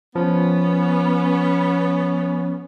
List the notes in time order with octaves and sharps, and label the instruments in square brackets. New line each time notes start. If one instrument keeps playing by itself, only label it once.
[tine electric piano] F3 [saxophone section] B3 C#4